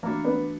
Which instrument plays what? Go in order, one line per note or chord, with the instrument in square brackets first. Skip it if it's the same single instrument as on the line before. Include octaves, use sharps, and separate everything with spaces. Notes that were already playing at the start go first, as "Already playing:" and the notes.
[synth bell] E3 A3 D4 F#4 [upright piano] A#3 A#4
[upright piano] B3 B4